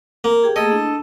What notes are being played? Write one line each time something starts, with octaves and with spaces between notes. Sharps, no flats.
A#3
G4 G#4 G5
A3 A#3 G#4 A4 D#5
D4 E4